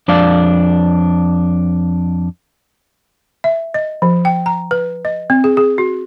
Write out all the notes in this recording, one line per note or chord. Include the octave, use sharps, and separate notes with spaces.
F2 D4 D5 F5
E5
D#5
F3
G5
A#5
B4
D#5
C4
G#4
G#4
F#4